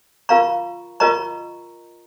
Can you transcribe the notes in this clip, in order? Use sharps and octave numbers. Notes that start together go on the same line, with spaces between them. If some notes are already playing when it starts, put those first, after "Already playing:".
F4 A#4 F5 A#5 C#6
F4 A#4 D#5 A#5 C#6